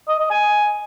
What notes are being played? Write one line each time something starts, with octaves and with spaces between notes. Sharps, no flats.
D#5
D#5
G#5